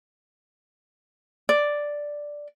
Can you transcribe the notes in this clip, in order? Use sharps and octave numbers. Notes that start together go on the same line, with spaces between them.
D5